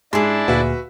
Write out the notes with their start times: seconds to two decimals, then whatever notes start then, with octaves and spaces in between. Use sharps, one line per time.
0.13 G#2 D4 E4 G#4 A5 C6
0.48 D2 A#2 F#4 B4 E5 F5